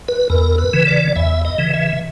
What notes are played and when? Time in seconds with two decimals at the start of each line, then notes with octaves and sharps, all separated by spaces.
0.08 B4
0.30 E2 A#4
0.58 B4
0.73 C#3 E3
0.87 D5
1.16 E2 E5
1.45 D#5
1.58 C#3 E3
1.74 E5